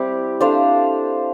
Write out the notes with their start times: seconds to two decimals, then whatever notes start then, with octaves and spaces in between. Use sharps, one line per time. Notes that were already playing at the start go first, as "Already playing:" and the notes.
Already playing: G3 C4 E4 G4
0.40 D4 A4 C5 F5